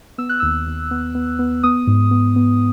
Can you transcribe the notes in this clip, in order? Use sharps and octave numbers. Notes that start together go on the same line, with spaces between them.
B3 E6
F#6
D#2 E6
D#2
B3
B3
B3
B3 D#6
G#2
B3
B3